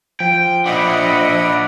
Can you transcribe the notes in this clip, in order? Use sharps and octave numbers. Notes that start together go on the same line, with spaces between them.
F3 G5
A#2 D4 D#5 E5 F#5 B5